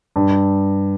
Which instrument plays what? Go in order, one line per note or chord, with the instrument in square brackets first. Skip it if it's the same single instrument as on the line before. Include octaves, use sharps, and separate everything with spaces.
[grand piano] G2